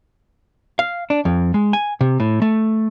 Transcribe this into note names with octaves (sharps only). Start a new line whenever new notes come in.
F5
D4
F2
G#3
G#5
C3
A2
A3